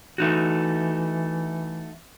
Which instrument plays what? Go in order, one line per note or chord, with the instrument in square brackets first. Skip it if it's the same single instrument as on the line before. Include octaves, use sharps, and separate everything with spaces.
[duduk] E3 [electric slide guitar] A3 D#4 F#4